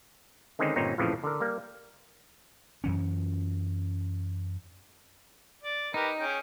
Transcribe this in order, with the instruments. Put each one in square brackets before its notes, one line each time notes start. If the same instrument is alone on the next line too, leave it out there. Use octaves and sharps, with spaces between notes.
[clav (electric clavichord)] D3 D#3 G#3 C4 C#4 D#4
G1 A#2 C4 C#4 D#4 C#5
A#1 F2 A2 C#3 E3 F3
D3 A#4
G3 A#3
[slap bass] F#2 E3 C#4
[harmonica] D5
[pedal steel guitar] D#4 [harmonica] G4 A#4 B4
[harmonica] C#4 G#4 G5